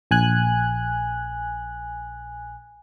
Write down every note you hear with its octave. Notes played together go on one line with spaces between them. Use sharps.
A#1 G#5 F#6